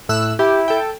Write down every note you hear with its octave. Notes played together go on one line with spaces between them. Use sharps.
A2 E6 F#6
E4 G4
A4 G5